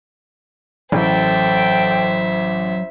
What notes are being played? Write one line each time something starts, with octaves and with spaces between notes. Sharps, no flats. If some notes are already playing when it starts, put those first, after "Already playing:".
A1 F#3 A4 C5 E5 G5